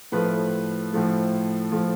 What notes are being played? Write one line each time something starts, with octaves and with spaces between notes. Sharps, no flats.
A2 F3 A3 B4
A2 F3 A3
A2 F3 A3